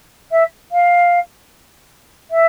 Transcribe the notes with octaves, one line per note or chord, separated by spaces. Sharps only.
E5
F5
E5